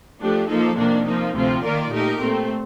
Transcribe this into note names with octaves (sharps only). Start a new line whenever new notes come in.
F3 A3 D4 G4
F3 A#3 D#4 A4
F2 C3 D#3 A#3 D4
F3 A#3 D#4
D2 C3 F3 C4 F4
D#3 A#3 F4 A#4 D5
A#2 A3 D#4 G4 A#4
A#2 A3 C4